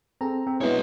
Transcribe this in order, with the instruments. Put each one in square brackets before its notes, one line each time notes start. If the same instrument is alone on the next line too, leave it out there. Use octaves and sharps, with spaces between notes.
[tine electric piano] C4 [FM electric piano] G#4 A4 A#5
[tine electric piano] C4
[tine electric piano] G#3 B3 G#4 [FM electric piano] C#4 D4 E4 [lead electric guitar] B4 C#5